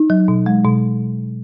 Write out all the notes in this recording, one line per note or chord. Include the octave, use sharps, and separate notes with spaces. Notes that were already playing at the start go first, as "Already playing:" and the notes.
Already playing: D#4
F#3
B2
G#3
B2